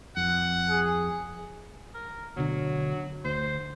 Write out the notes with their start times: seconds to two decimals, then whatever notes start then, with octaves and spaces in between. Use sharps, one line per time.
0.17 F2 F#5
0.69 G#4
1.94 A#4
2.36 D2 B2 D3 F#3
3.25 D2 C5